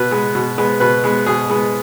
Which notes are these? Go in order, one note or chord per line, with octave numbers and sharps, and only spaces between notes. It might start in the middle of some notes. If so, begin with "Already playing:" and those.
Already playing: B2 B4
G#3 B3
B2
G#3 B3
B2 B4
G#3 B3
B2 G#4
G#3 B3